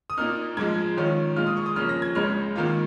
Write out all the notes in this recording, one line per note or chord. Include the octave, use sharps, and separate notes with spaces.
D#6
A#2 A#3 D#4 F6
G#2 F3 G#3 G#6
G#2 D#3 C#4 F4
A#2 G#3 F4 F6
D#6
C#6
D#6
C#3 F3 A#3 C#4 F6
A#6
G#6
C#2 C#3 G#3 F6
G#2 D#3 A#3 F4